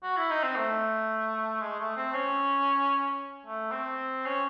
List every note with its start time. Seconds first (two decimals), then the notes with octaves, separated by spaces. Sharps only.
0.03 F#4
0.17 E4
0.30 D#4
0.43 C4
0.56 A3
1.61 G#3
1.80 A3
1.97 C4
2.14 C#4
3.46 A3
3.72 C4
4.25 C#4